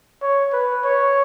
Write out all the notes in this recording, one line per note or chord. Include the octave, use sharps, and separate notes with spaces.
C#5
B4
C#5